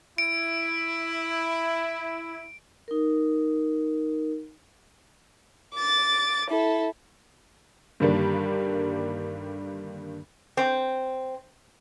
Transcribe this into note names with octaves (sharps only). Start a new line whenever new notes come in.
E4 D7
D#4 A#4
D6 A6
E4 A4
G2 D3 D#3 G3 A#3 D4
C4